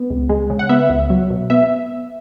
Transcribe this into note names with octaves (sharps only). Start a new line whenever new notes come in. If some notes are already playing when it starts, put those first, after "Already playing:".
Already playing: B3
C#2
G#3
C#3
F#5
B3 E5
C#2
F#3
B2
B3 E5